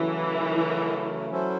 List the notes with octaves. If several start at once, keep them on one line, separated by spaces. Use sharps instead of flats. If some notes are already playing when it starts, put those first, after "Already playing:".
Already playing: C#3 E3 F#3 A3 C#4
F#3 C#4 E4 A4 C5